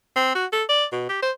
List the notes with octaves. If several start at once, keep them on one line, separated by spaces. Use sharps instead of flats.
C4
F#4
A4
D5
B2
G4
C5